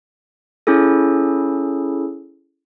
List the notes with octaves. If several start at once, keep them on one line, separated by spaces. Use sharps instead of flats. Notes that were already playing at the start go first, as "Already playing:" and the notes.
C#4 E4 G#4 A4